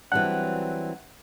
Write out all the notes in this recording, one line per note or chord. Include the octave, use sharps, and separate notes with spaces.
E3 F#3 G3 C4 D4 F#5 F#6